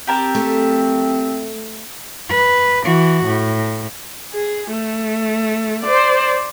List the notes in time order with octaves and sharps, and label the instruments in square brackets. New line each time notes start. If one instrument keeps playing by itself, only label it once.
[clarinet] C4 [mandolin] G4 A#4 A5
[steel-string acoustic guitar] A3
[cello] B4
E3 F#4
A2
[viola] G#4
A3
C5 D5